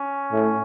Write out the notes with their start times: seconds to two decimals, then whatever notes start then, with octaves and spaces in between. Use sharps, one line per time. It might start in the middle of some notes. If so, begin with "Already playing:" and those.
Already playing: C#4
0.32 A2